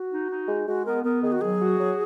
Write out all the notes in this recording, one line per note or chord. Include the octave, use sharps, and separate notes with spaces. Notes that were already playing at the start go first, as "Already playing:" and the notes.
Already playing: F#4
D#4
D#4
G#3
G#3 F#4
B3 A#4
B3 A#4
D#3 G#4
F#4
F#3 G#4
F#4
F#3